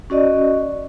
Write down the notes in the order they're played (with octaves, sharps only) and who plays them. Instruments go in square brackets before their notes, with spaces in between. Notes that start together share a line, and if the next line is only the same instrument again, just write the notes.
[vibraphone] C#4 F#4 D5 D#5